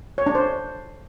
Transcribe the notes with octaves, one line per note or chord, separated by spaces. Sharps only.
C#5
D4
C5